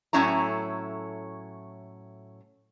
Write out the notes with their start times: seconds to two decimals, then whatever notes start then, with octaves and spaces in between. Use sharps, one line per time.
0.13 A2 F#3 A3 C#4 E4 A#5